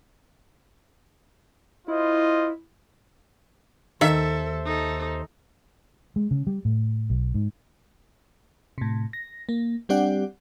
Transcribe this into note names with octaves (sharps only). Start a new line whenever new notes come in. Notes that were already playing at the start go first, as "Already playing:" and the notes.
E4 F4 C5 D#5
D#2 D#3 A4 C5 E5
D#4 A4
G#3
C#3
G3
A2
B1
G#2
A2 C3
A#6
A#3
G3 C4 D4 G4 D5 F#5